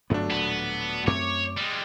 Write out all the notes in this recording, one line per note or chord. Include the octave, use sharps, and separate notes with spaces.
G1 G2 F#3 A3 B3 D4
D#1 A2 B3
F#2 A3 C4 C#5 D6
G3 G#3